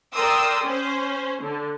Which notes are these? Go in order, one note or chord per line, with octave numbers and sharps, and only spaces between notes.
A#4 D5 G5 C6 D#6 E6
C#4 C5
D3